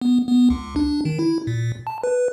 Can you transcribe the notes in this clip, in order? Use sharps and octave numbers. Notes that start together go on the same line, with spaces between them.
B3
B3
C#2
D4
D#3
E4
A#2
A5
B4